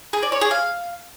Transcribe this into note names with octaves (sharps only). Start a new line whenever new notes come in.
G#4
D5
C#5
G#4
F5